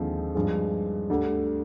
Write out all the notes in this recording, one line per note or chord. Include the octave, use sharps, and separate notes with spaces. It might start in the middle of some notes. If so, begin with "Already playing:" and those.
Already playing: D#2 D3 F3 G#3 C4
G2 F3 G#3
D2 D3 G3